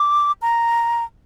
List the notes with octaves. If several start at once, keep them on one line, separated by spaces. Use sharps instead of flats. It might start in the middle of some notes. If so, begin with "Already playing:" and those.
Already playing: D6
A#5